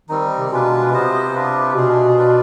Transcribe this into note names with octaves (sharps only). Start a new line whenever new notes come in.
D#3 G3 C4 D#4
C3
B2 G#3 D4 F4 B4
C3 B3 F4 C5 D#5
D4 F4 B4
B2 D4 F4 G#4
D4 F4 B4 D5